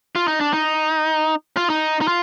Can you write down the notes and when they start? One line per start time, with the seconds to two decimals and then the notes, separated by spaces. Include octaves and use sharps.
0.15 F4
0.28 D#4
0.40 D4
0.53 D#4
1.57 F4
1.70 D#4
2.01 D#4
2.08 F4